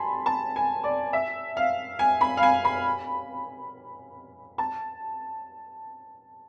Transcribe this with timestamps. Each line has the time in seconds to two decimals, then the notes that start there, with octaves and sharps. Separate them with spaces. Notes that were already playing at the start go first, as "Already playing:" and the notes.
Already playing: G#5 A5 B5 C6
0.26 A5
0.56 G#5
0.84 D5
1.13 E5
1.57 F5
1.99 G#5
2.21 B5
2.37 F5
2.43 G#5
2.65 B5
4.58 A5